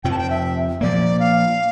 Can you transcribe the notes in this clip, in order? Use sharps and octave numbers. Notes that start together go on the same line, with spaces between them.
F2 C3 F3 G5
A5
G5
E5
A#2 F3 A#3 D5
F5